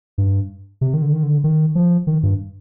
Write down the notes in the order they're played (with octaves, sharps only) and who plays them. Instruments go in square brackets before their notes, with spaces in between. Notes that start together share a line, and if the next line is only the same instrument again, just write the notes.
[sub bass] G2
C3
D#3
D3
D#3
D3
D#3
F3
D#3
G2